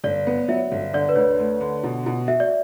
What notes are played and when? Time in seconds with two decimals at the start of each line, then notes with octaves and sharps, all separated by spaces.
0.04 G1 D5
0.27 B3
0.48 F#3 E5
0.72 G1
0.93 D3 D5
1.09 B4
1.16 D2 C#5
1.39 A3
1.61 D3
1.83 B2
2.06 B2
2.28 F#4 E5
2.40 D5